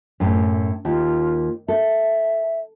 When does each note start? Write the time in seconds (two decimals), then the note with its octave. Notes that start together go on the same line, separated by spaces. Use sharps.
0.20 F#2 A2
0.85 D#2 F4
1.68 A4 E5